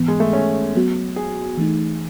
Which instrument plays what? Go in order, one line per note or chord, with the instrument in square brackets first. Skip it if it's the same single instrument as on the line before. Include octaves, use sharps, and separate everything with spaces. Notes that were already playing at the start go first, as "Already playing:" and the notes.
Already playing: [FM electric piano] G#2 E3 B3
[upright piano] G#3
A3
C#4
[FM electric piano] F#3 B3 F#4
[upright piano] G#4
[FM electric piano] E3 A3 D#4